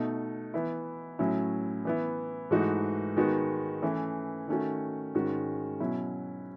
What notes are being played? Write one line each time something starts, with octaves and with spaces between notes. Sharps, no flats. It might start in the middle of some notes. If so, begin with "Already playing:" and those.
Already playing: B2 A3 D#4
E3 B3 E4
A2 F#3 C#4 E4
E3 B3 E4
G#2 E3 A3 D#4 F#4
D#3 G#3 B3 D#4 F#4
E3 A3 C#4 E4
D#3 A3 C#4 F#4
G#2 D#3 G#3 C#4 F#4
B2 F#3 C#4 E4